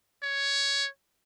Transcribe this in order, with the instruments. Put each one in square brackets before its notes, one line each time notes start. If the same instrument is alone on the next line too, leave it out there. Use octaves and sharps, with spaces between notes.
[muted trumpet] C#5